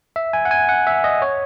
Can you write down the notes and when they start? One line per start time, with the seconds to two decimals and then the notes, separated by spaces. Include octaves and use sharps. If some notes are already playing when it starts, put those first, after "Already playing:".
0.16 E5
0.33 G#5
0.45 F#5
0.51 G#5
0.69 F#5
0.87 E5
1.04 D#5
1.22 C#5